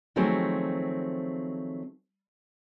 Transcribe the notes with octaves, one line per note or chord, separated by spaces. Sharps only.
D#3 F3 F#3 A3 C4 G#4